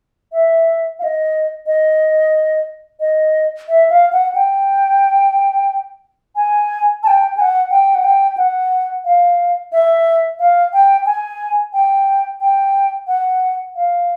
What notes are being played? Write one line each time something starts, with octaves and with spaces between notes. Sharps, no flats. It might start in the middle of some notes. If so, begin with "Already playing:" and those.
E5
F5
D#5
D#5
D#5
E5
F5
F#5
G5
G#5
A5
G5
G#5
F#5
G5
F#5
G5
F#5
F5
E5
F5
G5
G#5
G5
G5
F#5
F5